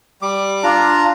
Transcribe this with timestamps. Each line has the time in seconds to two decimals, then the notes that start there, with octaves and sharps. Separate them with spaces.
0.22 G3 D6
0.63 D4 F4 A#5